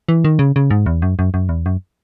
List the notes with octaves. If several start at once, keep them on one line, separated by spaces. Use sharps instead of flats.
E3
D#3
C#3
C#3
G#2
E2
F#2
F#2
F#2
E2
F#2